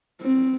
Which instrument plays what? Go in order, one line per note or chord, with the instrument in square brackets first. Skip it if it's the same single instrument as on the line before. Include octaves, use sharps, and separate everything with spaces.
[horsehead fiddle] C4